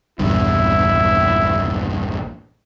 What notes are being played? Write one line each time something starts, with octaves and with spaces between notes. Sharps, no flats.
A#1 E2 G2 E4